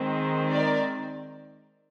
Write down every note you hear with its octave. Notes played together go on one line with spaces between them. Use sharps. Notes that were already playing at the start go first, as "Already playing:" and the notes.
Already playing: D#3 G#3 C4
A#4 D5